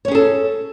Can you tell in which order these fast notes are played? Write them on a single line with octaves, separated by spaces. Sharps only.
C#5 C#4 G#4 A4